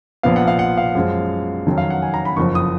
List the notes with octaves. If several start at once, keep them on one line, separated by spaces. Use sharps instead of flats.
A#1 A#2 F3 B3 F5
F#5
F5
F#5
F5
F#2 F3 G#3
F2 D#3 F#3 C#4
F5
F#5
G#5
A#5
B5
F#1 F2 F3 C#6
D#6